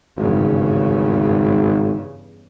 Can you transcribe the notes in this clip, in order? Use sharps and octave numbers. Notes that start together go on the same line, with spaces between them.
G#1 E2 G2 C#3